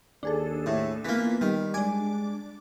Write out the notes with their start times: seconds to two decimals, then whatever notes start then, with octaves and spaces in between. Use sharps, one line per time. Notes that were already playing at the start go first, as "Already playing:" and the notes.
0.23 D#2 D4 G#4 A4
0.66 A2
1.05 E3 A#3 B3 F4 B6
1.41 D#3 G3
1.74 G#3 D4 G#5 D6